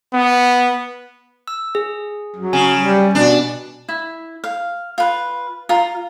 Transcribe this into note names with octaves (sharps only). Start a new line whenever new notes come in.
B3
E6
G#4
F#3
C#3 G#5
G3
B2 D4
E4
F5
F4 B4
F4 A#5